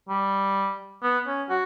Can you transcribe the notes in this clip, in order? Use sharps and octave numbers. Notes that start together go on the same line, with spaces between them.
G3
B3
C#4
F#4